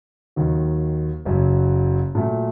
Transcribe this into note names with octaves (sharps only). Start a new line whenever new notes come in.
D#2 D#3 F#3
F#1 F#2 F#3
A#2 F#3 A3